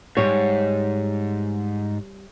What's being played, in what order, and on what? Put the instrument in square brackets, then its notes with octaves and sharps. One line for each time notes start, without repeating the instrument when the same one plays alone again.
[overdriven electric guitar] G#2 [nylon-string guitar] G3 C#5